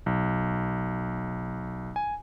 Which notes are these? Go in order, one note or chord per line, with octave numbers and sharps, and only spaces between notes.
B1
G#5